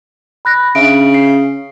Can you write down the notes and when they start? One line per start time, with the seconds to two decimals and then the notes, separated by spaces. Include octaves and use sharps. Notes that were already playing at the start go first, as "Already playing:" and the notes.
0.45 B5 F#6 A#6
0.75 C#3 D4 E5 D7
1.14 C7